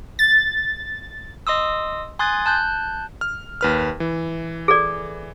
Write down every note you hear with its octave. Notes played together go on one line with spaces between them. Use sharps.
A6
D#5 C6 D#6 E6
G#5 C6 D#6 F#6 G#6 A6
A5 F#6 G6
F6
D#2 B4 F6
E3
G#4 A4 D5